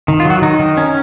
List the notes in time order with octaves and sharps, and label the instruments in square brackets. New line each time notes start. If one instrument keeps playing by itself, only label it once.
[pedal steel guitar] D#3
F4
F#3
F#4
D#3 D#4
D#3
C#4